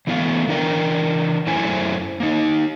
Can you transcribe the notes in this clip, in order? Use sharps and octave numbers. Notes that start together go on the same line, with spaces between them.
E3 A3 B3 E5 F5
E3 D4 A#4 G5
F#2 A3 C#4 E4 C5 G#5
A#3 D#4